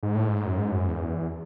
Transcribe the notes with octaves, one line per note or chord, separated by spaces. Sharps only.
G#2
A2
G#2
F#2
G#2
F#2
E2